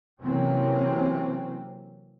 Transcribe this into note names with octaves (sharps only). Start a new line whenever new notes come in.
C3 E3 F#3 A#3 C4 C#4